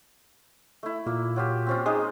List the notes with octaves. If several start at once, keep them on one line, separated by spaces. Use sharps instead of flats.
A3 E4
A#2 A#3
F#3 F4 G4
C4 C#4 F4
G#3 D#4 G#4